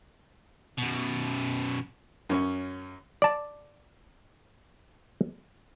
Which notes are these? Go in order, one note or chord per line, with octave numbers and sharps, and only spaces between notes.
F#2 B2
F#2 C#4 C#6
D5 A5